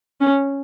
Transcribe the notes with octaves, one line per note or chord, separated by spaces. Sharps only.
C#4